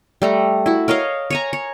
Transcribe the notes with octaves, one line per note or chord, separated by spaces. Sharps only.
G3 A3 A#5
E4 F#4
A#4 C#5 D#5 F5
C#5 G#5 A#5
C#5